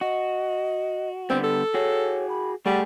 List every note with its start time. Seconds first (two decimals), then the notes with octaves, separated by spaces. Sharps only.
0.01 F#4 D#5
1.30 D3 G3 B3 C4
1.44 A4
1.74 F#4 G#4 C#5
2.29 B5
2.66 G3 A3 G4 G#4 F#5